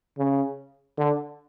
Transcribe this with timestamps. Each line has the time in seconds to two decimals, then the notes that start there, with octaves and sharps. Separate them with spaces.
0.18 C#3
0.98 D3